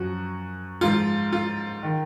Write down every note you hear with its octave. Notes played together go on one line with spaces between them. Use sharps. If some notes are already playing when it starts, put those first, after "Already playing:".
Already playing: F#2 F3 F#4
G#2 F3 F4
F4
D#3